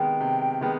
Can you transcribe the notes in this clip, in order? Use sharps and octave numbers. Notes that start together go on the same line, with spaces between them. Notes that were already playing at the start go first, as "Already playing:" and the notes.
Already playing: C3 D#3 G#3 B3 G5
C3
D#3 G#3 B3